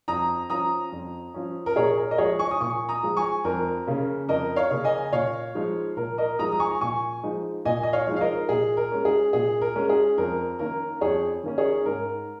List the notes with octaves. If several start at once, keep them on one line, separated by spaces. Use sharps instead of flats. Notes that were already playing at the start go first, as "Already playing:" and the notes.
F2 A#5 D#6
F3 C#4 A#5 D#6
F2
F3 C#4
A#4
A#2 G#4 C#5
A#4
D#5
F3 G#3 G#4 C#5
G#5 C#6
D#6
A#2 G#5 C#6
A#5 D#6
F3 G#3
G#5 C#6
F2 A#4
C#3 A#3 C#4
F2 A#4 D#5
C#5 F5
C#3 A#3 C#4
D#5 G#5
A#2 C#5 F5
F3 G#3 D#4
A#2 A#4
A#4 D#5
F3 G#3 D#4 A#5 D#6
D#6
G#5 C#6
A#2 G#5 C#6
F3 G#3 D#4
A#2 D#5 G#5
D#5
C#5 F5
F3 G#3 D#4
F5
A#4 D#5
A#2 G#4
A#4
G#3 C#4
G#4
A#2 G#4
A#4
G#3 C#4
G#4
F2 A#4
D#3 A#3 C#4 A#4
F2 G#4 C#5
D#3 A#3 C#4
G#4 C#5
G#2 A#4